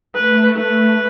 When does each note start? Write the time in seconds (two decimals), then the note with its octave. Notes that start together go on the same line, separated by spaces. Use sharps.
0.15 A3 B4
0.57 B4